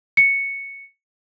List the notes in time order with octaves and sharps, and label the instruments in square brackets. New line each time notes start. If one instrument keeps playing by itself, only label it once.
[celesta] C#7